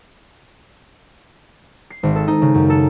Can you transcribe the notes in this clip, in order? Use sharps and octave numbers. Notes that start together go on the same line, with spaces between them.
C7
G#1
A4
D#4
C#3
F#2
A4